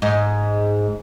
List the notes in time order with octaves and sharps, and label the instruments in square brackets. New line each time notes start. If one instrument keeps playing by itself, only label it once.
[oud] G#2